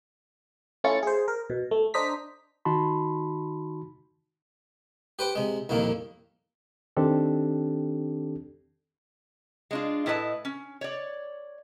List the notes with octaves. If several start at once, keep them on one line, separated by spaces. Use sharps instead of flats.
A3 C#4 E4 F4 A6 C#7
G#4 C5
A#4
B2
A3
D4 C5 D#5 A#5 B6
D#3 D#4 F#4 A5 B5 C6
G4 B4 C5 G5
C3 G#3
C2 F2 A#2 D#3 A#3
D#3 C4 D4 G4 A4
G#3 D4 F4
A2 E4 A4 B4 D#5 A5
C#4
C#5 D5